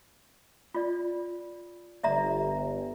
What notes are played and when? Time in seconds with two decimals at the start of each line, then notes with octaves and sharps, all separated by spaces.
0.75 F4 D5
2.03 G1 D5 E5 A#5